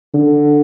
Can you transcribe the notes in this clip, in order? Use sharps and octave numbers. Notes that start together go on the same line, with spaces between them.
D3